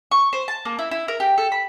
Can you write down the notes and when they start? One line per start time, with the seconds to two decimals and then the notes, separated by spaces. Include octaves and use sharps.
0.11 C#6
0.33 C5
0.48 A5
0.65 A#3
0.79 E4
0.91 E4
1.08 A#4
1.20 G4
1.38 A4
1.52 B5